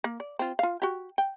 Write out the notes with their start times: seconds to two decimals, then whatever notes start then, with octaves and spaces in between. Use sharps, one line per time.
0.04 A#3
0.20 D5
0.39 C4 F4
0.59 F4 F5
0.82 F#4 G4
1.18 G5